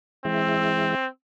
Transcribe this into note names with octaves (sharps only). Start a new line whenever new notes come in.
E3 G#3 C4 E5